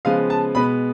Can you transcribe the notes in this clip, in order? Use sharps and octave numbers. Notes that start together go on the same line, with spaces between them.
C#3 F3 G#3 B3 F5
A5
B2 G#3 B3 B5